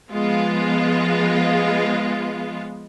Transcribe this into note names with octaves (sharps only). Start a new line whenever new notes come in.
F3 G#3 B3 F4